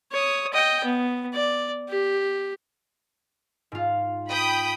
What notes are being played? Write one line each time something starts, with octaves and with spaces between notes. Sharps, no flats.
C#5 D#6
D#5 G5
B3
D5
G4
G#2 F4
G5 B5 D#6